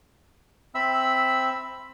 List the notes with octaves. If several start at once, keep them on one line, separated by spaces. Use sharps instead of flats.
C4 E5 B5 E6